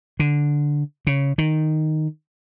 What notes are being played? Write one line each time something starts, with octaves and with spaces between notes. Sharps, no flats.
D3
C#3
D#3